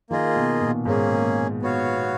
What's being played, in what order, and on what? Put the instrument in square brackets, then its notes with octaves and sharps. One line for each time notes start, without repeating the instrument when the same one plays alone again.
[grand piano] D#3 [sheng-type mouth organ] A#3 F4 G#4 D#5
[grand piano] B2
A#2
[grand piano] G#2 [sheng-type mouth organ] A#3 C#4 G#4
[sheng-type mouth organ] B3 F#4 C#5 F5